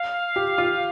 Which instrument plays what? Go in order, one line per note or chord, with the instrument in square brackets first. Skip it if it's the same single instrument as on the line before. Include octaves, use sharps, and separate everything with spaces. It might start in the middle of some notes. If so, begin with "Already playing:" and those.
Already playing: [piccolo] F5
[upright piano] G4
F4